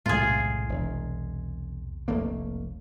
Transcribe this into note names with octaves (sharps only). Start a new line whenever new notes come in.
B1 E2 A2 C3 G#3 F4 G#4
E1
F1 A3 A#3